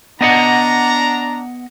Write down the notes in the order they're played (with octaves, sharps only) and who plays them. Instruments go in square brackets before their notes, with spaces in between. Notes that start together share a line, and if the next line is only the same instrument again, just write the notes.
[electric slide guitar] B3 D#5 F#5 [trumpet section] D4 A#5